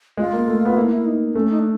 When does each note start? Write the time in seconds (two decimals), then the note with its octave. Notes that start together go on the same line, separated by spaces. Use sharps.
0.17 G#3 F4
0.33 A#3
0.48 A3
0.65 B3
0.76 A#3 E4
0.91 E4
1.05 D#4
1.34 A3 C#4
1.50 D#4
1.59 D4